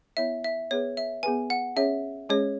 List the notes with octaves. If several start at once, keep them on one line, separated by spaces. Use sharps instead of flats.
B3 E4 C#5 E5
E5
B3 G#4 B4 C#5
E5
B3 G#4 B4 G#5
F#5
C#4 G#4 C#5 E5
G#3 C#4 G#4 C#5